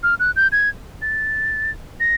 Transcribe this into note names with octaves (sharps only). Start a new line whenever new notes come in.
F6
F#6
G6
G#6
A6
A#6